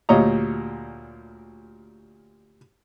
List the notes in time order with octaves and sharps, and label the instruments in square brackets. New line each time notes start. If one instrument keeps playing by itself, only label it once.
[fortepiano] D2 A#2 G3 C#5 D#5 A#5